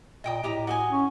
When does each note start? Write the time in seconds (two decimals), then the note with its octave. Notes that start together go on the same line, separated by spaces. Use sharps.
0.24 A#2 D#5 G5 D#6
0.44 A2 G4 D#5 A#5
0.67 F#4 D#5 G#5
0.90 C#4